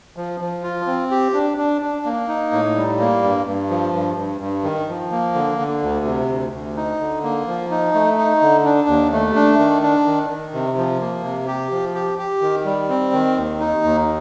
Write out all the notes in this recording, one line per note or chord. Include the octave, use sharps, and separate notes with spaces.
F3
F3
F4
C4
G4
D4
D4
D4
A#3
D#4
A2
G3
A#3
G2
G2
F3
G2
G2
G2
D#3
F3
A#3
D3
D3
D2
C3
D2
D2
D#4
D3
A#3
F3
D#4
A3
D#4
D3
D4
D#2
A3
D4
D#3
D4
D#3
D#3
C3
F3
A#3
C3
G4
F3
G4
G4
D#3
G3
C4
D#3
D#2
D#4
D#2